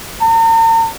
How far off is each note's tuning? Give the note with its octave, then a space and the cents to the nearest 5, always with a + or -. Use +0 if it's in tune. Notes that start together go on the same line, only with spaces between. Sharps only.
A#5 -45